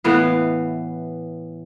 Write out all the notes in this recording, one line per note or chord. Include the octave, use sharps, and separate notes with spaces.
A2 E3 B3 F5